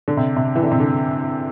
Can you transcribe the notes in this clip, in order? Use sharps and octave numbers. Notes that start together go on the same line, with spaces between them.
D3
C3
C3
E3
D3
C3
D3